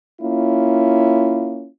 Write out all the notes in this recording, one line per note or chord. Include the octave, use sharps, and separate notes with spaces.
A#3 C#4 E4 F4